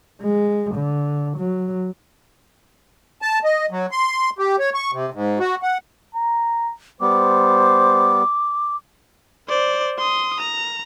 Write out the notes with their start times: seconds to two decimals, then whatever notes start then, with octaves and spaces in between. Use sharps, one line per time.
0.22 G#3
0.75 D3
1.37 F#3
3.22 A5
3.44 D#5
3.71 F#3
3.91 C6
4.39 G4
4.59 C#5
4.74 C#6
4.93 C3
5.13 G#2
5.39 F#4
5.62 F#5
6.15 A#5
7.01 G3 B3 C5 D6
9.49 C5 D5
9.98 C6 D#6
10.41 A#5